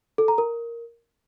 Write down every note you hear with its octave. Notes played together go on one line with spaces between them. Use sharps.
A4
A#5
A#4